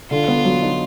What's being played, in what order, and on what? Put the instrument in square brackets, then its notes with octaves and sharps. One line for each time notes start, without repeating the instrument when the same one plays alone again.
[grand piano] D3 [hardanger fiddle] F4
[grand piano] B3
F#3
D#4